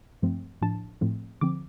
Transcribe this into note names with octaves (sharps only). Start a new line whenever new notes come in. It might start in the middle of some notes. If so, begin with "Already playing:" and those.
G2 F3 A3 C4
A2 F3 D4 A5
A2 F3 A3 C4
D3 F3 C4 D6